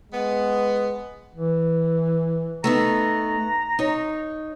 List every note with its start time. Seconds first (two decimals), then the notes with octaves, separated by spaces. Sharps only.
0.12 G#3 B3
1.34 E3
2.64 A3 B3 D#4 A#5
3.79 D#4 C#5